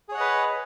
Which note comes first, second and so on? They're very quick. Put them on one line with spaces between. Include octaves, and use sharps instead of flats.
G#4 C#5 F#5 D#5 B4